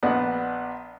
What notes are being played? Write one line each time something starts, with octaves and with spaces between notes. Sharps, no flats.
A#1 B3 D4 D#5 F#5